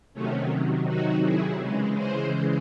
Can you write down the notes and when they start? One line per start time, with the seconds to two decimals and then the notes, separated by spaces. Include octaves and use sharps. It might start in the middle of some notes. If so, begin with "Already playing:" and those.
0.14 C3 D#3 F#3 A3 C#4
0.87 D#4 F#4
1.24 E4 G#4
1.60 C#3 E3 G#3
1.97 G#4 C5